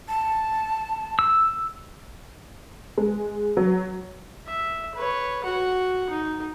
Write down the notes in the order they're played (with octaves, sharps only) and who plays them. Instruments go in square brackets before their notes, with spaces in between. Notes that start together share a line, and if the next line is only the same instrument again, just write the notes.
[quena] A5
[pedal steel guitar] E6
[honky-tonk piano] G#3
F#3
[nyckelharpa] E5
B4 C#5
F#4 F#5
D#4